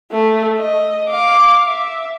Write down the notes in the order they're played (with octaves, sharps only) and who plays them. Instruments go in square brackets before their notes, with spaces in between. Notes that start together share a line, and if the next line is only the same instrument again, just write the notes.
[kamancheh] A3
D#5
F5 D6
E5